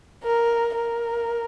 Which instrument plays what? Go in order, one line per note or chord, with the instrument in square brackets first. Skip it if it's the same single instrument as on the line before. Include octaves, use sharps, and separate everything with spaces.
[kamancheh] A#4
A#4